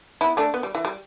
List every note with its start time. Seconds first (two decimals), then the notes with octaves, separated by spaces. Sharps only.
0.21 B3 E4
0.37 A3 D4
0.54 B3
0.63 G3
0.75 E3
0.85 G3